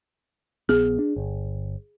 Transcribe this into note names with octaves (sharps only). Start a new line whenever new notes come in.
A#1 B3 G#4
D4
G1